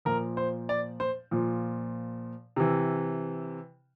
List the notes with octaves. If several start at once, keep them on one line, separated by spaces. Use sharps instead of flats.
A#2 F3 A#4
C5
D5
C5
A#2 F3
C3 E3